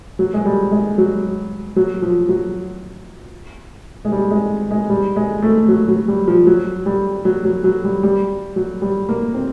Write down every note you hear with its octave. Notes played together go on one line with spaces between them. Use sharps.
F#3
G#3
G3
G#3
F#3
F#3
F3
F#3
G#3
G3
G#3
G#3
G3
G#3
A3
F#3
F#3
G3
F3
F#3
G3
F#3
F#3
F#3
G3
G3
F#3
G3
A#3
C4